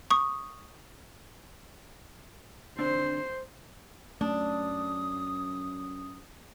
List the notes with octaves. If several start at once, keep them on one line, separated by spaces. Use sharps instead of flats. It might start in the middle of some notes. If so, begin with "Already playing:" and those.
C#6 D#6
D3 C4 D4 C5
F#2 A3 D4 D#6